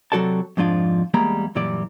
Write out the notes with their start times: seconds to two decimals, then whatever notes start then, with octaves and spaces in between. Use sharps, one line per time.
0.12 C3 F#3 F#4 A4 D5 A5
0.57 F2 G#2 F3 D4 F4
1.14 E2 G3 G#3 A#3 A#5 B5
1.55 F#2 A#2 E3 G3 D5